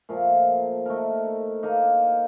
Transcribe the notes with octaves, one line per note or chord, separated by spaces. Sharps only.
A#2 F3 A3
A3 D#4 A#4
A#3 D#4 A#4